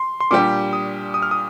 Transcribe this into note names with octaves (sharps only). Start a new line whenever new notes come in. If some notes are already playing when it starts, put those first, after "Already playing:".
Already playing: C6
C6
A#2 G3 D4 G4 D6
D#6
D#6
F6
D#6